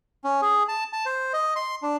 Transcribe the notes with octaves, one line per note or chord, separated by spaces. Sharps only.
C#4
G#4
A5
A5
C5
D#5
C6
D4